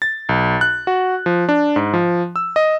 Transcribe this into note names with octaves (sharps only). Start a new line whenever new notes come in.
A6
B1
F#6
F#4
F3
D4
G#2
F3
E6
D#5